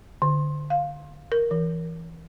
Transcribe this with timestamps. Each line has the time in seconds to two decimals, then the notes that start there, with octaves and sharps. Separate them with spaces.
0.22 D3
0.70 F5
1.32 A#4
1.51 E3